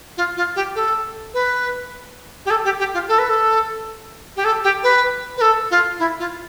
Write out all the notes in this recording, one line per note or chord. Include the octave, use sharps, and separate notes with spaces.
F4
F4
G4
A4
B4
G4
A4
G4
G4
F4
A4
B4
A4
G4
A4
G4
B4
B4
A4
F4
E4
F4